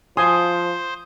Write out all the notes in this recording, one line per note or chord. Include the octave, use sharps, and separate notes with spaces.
F3 C5 G#5 C6 D#6